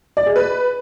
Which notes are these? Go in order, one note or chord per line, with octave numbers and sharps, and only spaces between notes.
D5
G#4
B4